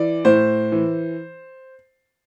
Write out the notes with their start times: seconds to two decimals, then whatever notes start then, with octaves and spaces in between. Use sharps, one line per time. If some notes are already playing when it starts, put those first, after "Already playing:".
Already playing: E3 D5
0.25 A2 C5
0.72 E3